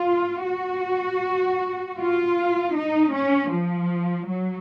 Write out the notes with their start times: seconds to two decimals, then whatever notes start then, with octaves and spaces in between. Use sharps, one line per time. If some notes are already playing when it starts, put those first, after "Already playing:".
Already playing: F4
0.46 F#4
1.98 F4
2.74 D#4
3.12 C#4
3.51 F3
4.27 F#3